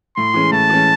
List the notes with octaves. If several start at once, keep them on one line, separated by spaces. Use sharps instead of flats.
A2 C6
E3 G#3 C#4
A2 A5
E3 G#3 C#4